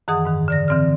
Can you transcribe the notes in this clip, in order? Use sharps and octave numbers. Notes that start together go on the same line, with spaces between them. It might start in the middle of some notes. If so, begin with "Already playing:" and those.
F#2 D#3 E3 G#4 F#5 D#6
G#2 D#3
D3 D5 A#6
D3 E3 C4 D5 F6